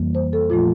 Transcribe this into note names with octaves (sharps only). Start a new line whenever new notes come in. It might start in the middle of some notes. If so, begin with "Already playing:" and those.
Already playing: F2 E3 G3 A#3
C5
A4
A#2 F3 A3 F4